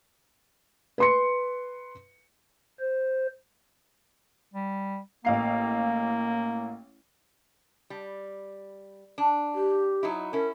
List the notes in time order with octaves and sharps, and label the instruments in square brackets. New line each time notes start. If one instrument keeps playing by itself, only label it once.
[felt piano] B4 C6 C#7
[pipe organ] C5
[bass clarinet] G3
[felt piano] A1 F5 C7 [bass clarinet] A#3
[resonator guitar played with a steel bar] G3
D4
[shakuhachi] G4
[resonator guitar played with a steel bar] F#3 D#4 E4
[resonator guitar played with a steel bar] C#4 E4 [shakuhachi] A#4